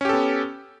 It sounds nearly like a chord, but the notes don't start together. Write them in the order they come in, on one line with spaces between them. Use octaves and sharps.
C#4 G4 A4 B3